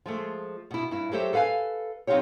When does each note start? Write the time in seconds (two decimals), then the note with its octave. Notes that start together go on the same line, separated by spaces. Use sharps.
0.06 F3 G#3 A3
0.71 B2 E4
0.91 G2 E4
1.12 F#3 A3 G4 A4 C5 E5
1.33 A4 B4 F5 F#5 G#5
2.07 F#3 C4 D#4 F4 G4 C#5